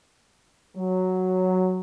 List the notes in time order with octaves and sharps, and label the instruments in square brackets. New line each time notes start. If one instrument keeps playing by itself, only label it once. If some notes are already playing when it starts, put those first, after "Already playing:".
[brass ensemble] F#3